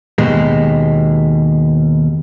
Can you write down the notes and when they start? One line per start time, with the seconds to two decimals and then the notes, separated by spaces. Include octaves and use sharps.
0.18 D#2 B2 G#3